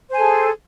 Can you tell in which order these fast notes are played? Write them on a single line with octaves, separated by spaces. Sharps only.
C5 G#5 A4 G#4